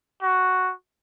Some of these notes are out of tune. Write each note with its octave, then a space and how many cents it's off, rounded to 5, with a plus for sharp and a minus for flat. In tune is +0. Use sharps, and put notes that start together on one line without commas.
F#4 +0